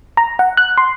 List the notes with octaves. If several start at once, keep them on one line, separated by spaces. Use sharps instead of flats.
A#5
F#5
F#6
C6